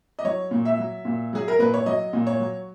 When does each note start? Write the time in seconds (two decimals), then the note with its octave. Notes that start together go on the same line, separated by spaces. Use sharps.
0.19 D#5
0.24 F#3 C#5
0.51 A#2
0.65 E5
0.78 F#3
1.05 A#2
1.33 F#3 G#4
1.48 A#4
1.59 A#2 B4
1.74 C#5
1.86 F#3 D#5
2.13 A#2
2.27 C#5
2.39 F#3